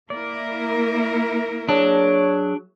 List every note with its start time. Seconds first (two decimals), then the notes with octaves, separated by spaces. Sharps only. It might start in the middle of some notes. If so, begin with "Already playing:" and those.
0.10 A#3 E4 A#4 D5
1.69 F#3 D4 G#4 C#5 A5